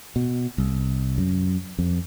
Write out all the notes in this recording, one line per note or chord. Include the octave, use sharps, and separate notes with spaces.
B2
C2
F#2
F2